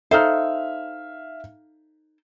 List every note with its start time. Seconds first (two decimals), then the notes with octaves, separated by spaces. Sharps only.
0.11 D#4 A4 C5 E5 F5 F6